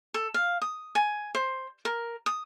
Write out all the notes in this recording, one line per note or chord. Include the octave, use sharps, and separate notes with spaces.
A4
F5
D#6
G#5
C5
A#4
D#6